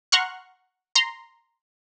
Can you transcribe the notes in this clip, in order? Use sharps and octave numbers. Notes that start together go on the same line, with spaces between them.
F#5 A#5 C6 C#6 F6 F#6
A#5 C6